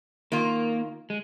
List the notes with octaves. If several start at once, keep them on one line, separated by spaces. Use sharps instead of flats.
D#3 A#3 F4
G#3